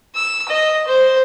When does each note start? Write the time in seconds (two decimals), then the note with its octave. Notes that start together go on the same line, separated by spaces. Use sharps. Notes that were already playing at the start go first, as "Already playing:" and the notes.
0.16 E6
0.49 D#5
0.88 C5